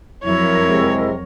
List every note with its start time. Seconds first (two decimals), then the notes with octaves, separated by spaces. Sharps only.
0.24 F2 F#3 E4 A#4 C#5
0.69 C3 G#3